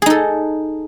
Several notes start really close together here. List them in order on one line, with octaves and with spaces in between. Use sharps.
G#4 D#4 A4